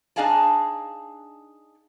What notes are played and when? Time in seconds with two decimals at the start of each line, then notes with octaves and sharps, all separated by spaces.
0.16 D4 D#4 G#4 F5 G#5 A5